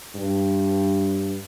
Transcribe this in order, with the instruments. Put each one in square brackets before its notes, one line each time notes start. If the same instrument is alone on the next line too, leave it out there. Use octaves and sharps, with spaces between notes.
[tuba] G2